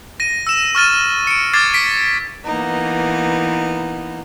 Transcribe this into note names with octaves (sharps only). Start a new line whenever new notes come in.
A#6 D#7
E6 E7
C#6 F6 A6 D#7
C#7 D7
D6 F6 G#6 A6 C7 E7
B6 D7
E3 A#3 B3 D#4